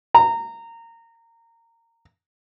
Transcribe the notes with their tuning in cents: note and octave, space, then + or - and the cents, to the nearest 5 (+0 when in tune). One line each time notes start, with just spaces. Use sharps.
A#5 -20